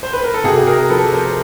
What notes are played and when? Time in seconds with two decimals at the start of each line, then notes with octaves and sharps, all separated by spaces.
0.03 C5
0.13 B4
0.24 A#4
0.34 A4
0.44 C3 F#4 G#4
0.67 G#4 A#4
0.89 F3 A4 B4
1.12 A#4 C5